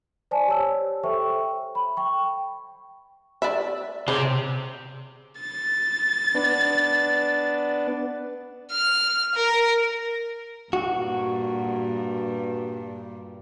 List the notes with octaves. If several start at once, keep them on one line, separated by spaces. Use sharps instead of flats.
C5 D5 G#5 A5
G4 C#5 E6
A4 C5 E5 G5 C#6
B5
G5 C#6
D5 E5
C3 G#4 C5 C#5
A6
B3 D4
F6
A#4
G2 A#2 F#4